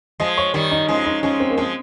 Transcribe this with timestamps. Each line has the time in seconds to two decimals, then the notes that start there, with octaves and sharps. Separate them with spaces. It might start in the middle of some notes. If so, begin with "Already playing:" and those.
0.20 F3 G#3 D#5
0.38 C#5
0.54 D#3 G3 C#5
0.71 D#4
0.88 F3 G#3 C#4
1.06 D#4
1.23 F3 G#3 C#4
1.40 C4
1.50 A#3
1.57 F3 G#3 C4